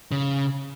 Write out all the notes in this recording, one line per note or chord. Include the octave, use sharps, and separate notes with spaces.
C#3